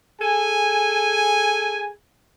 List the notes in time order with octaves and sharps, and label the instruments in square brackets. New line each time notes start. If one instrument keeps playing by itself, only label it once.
[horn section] G#4 A4 G#5